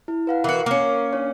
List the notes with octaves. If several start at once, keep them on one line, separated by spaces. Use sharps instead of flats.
E4
B4 F5 F#5
E3 F#4 A#4 C7
A#3 C#4
D4 C#5